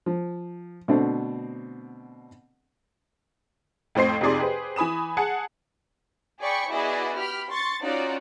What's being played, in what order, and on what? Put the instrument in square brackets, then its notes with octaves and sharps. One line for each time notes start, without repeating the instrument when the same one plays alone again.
[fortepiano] F3
B2 D3 A3 C4 D4
[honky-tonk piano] F2 A2 C4 C5 C7
F2 C3 D#4 G#4 D5 C6
G4 G#4 B4 C5
E3 G#5 B5 D#6 E7
G#4 F#5 G#5 A5
[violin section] G#4 D5 G5 B5 C#6
B3 E4 F#4 G#4 D5 D#5
G4 B5 F6
C6 C#6 A6
C#4 D#4 F4 F#4 D5